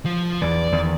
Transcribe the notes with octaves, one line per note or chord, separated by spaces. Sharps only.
F3
E2 E3 D5
E2 D#3